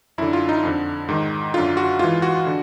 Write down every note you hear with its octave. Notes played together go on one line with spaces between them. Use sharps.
F#2 D3 E4
F4
D#4
F2 D3
G#2 D#3
F#2 D3 F4
F#4
G#2 E3 F4
F#4
D3